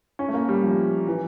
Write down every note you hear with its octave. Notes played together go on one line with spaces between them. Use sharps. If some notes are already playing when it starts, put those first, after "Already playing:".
C#4
A3
A#3
G3
F3
E3